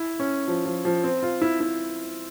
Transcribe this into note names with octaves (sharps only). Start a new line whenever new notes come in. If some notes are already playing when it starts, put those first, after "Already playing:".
Already playing: E4
C#4
F3
F3
F3
C4
F4
E4
E4